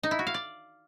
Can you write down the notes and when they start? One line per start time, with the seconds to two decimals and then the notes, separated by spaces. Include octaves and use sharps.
0.03 D#4
0.11 E4
0.19 F#4
0.27 F5
0.34 D5